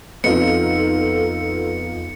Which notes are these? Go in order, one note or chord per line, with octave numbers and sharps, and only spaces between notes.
F2 B3 D#4 F4 A4 C#7